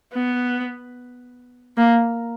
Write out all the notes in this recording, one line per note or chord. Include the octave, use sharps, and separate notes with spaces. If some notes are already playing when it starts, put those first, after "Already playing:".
B3
A#3